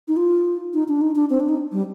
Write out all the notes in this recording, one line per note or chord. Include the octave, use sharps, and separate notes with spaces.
D#4
F4
D#4
D4
D#4
D4
C4
D4
D#4
G3